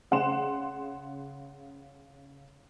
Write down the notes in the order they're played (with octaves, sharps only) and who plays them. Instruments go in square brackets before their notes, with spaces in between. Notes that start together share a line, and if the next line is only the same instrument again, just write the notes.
[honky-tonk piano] C#3 F#5 C6 E7